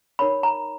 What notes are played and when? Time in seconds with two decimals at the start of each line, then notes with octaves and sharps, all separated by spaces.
0.19 D#4 A#4 C#5 B5
0.43 A#5